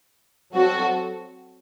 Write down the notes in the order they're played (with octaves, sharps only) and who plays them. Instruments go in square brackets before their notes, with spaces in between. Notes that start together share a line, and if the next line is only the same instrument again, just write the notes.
[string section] F#3 C4 F#4 A4